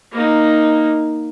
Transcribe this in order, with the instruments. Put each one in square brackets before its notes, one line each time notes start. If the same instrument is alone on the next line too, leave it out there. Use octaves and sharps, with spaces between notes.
[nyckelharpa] A#3 D#4